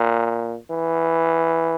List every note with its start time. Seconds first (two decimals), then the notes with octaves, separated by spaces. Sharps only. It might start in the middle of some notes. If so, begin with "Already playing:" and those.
Already playing: A#2
0.70 E3